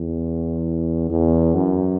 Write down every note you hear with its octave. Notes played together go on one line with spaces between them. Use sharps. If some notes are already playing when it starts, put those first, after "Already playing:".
Already playing: E2
E2
F#2